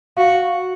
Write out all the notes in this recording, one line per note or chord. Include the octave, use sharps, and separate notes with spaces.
F#4 F5